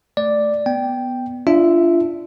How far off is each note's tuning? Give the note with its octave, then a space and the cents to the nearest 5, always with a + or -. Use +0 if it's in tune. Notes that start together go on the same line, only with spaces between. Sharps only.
A3 +0 D5 +0
B3 +0 G5 +0
D4 +0 F4 -25 E5 +0